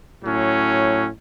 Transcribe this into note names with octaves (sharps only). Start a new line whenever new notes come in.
A2 F#3 C#4